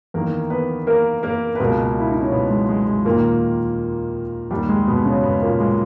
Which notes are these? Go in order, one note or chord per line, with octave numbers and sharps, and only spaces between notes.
E2 D#3 A#3 A#4
B3 B4
A#3 A#4
A#3 A#4
B4
C#2 B2 A#3 A#4
E4
D#4
C#4
B2 B3
G#3
G#3
G#3
D#2 A#2 D#3 A#3
D#2 D#3 G3
G#3
B2 B3
C#3 C#4
B2 B3
A#2 A#3
G#3